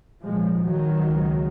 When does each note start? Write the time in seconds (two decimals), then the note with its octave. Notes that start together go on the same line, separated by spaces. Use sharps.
0.22 A#1 G#2 F3 G#3
0.60 D#3 F#3
0.97 C#2 C#3